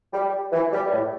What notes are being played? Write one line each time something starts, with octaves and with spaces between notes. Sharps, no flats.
G3
E3
G3
A2